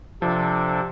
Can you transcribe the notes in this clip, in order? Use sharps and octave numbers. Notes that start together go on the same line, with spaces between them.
C3 F3 D4 A4